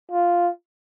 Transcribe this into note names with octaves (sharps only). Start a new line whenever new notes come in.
F4